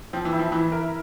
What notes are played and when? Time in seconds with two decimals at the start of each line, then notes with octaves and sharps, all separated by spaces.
0.13 F3 C4
0.25 E3
0.33 E4
0.39 F3
0.52 E3 E4
0.72 A#4